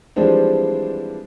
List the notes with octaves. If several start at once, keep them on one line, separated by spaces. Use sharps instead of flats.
E3 F3 G3 G#3 C4 D4